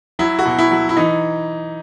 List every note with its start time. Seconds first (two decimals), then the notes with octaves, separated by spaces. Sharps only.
0.19 F#3 E4
0.39 F#4
0.45 B2
0.59 E4
0.71 F#3
0.89 E4
0.97 E3 D#4